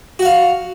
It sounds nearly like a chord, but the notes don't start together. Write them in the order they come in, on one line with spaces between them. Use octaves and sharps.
F#4 F#5 F5